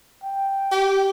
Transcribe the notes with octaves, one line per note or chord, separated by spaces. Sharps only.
G5
G4